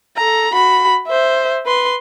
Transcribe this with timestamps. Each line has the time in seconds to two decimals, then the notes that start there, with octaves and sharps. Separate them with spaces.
0.16 A4 A#5
0.53 F#4 B5
1.07 C5 E5
1.66 B4 C6